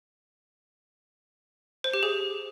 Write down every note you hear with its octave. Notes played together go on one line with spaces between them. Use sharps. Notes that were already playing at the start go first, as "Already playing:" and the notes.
C5
G4
G#4